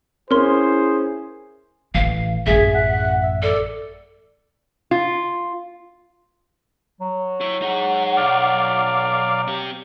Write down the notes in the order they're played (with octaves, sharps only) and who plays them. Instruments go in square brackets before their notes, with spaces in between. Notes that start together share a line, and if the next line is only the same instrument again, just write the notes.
[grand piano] C#4 [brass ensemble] E4 G#4 [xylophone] A#4 C6 [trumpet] C5
[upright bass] A1 E3 [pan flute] F5
[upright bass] A1 F#2 [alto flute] G#4 [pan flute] E5
[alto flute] F#5
E5
[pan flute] A4 [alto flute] D5
[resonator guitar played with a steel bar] F4
[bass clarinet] F#3
[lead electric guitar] E4 C#5
[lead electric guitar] D#4 G#4 [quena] F#5
[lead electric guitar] B1 [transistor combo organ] D5 F5
[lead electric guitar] C4 G4